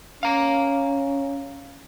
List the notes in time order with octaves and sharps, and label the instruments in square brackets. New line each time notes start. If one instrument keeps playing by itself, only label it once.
[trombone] C#4 [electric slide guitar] F5 A#5